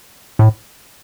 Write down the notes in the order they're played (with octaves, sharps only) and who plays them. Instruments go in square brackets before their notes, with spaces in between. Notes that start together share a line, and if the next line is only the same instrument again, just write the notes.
[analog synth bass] A2